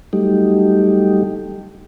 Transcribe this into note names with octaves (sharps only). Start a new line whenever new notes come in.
F#3 G3 A3 D#4 G4